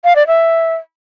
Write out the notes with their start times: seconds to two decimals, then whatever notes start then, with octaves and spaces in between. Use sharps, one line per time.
0.04 F5
0.16 D5
0.27 E5